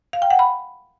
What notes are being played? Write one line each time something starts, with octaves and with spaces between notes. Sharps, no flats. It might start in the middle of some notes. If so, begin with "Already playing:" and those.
F5
G5
F#5
B5